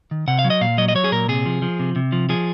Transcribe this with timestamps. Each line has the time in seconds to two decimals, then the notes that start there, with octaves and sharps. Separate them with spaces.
0.11 D#3
0.27 C3 F#5
0.39 F5
0.44 F#3
0.50 D#5
0.61 A#2 F5
0.78 F#3 D#5
0.88 D#5
0.95 F#3 C#5
1.04 G#4
1.12 A#2 A#4
1.28 C3 G#4
1.46 F3
1.62 F3
1.79 C3
1.96 C3
2.12 F3
2.29 F3 G#4